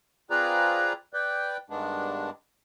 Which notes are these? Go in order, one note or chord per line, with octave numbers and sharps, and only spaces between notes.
C4 F4 G#4 B4 D5 A#5
B4 D5 G5
G2 D#3 G#3 B3 D4